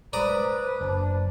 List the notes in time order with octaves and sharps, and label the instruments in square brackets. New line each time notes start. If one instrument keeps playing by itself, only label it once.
[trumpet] B4 [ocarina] C5 [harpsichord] D5 A#5 D#6
[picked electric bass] F#1 [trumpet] D4